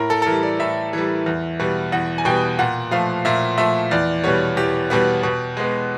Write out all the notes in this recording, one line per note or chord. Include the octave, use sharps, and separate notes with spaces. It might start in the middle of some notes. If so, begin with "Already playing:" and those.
Already playing: A2 A#4
A4
A4
E3 G3 A#4
D5
A2 E5
E3 G3
E2
B2 G3 B3
E2 F#5
G#5
B2 G3 B3 G5
A#2 F#5
F3 A3 F5
A#2 E5
F3 A3 E5
E2 D5
B2 G3 B3 C#5
E2 G4
B2 G3 B3
B2
G#3 B3